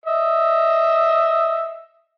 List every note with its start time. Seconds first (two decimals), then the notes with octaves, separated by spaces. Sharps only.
0.06 D#5 E5